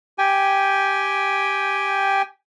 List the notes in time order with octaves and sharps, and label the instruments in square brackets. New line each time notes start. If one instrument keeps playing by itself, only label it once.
[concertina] G4 G5 G#5